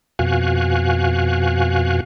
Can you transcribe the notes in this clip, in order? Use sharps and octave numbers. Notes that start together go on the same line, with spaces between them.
F2 B2 F#4 F5 G#5 F#6